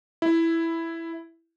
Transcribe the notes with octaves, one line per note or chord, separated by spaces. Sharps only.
E4